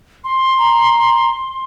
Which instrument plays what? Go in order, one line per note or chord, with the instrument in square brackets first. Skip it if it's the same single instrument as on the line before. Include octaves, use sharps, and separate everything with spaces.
[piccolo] C6
[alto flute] A#5